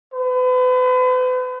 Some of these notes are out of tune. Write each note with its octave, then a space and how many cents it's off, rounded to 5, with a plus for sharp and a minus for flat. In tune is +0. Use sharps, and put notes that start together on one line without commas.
B4 +40